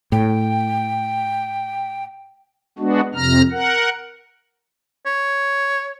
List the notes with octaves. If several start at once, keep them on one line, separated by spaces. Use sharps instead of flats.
A2 G5
G#3 B3 D4 F#4
F2 C3 A#5 F6
A#4 F#5
C#5